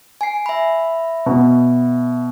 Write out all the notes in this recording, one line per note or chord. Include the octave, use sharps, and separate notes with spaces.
G#5 C7
E5 B5
B2